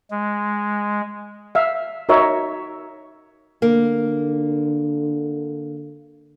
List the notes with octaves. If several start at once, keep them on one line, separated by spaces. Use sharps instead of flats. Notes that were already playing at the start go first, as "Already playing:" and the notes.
G#3
E5 F5
D#4 F#4 A#4 C#5 E5
D3 A#3